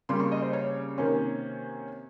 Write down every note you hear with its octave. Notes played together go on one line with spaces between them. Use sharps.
C#3 G3 A#3 C6
C#6
D#5
C5
C#5
C3 D#3 A#3 C#4